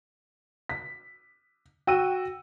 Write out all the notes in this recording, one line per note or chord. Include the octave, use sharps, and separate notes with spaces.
B6
F#4 G5 E6 D#7